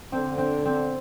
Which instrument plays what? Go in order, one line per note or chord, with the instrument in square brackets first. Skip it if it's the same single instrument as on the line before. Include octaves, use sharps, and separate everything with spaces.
[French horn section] D3 [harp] C4
[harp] C4
C4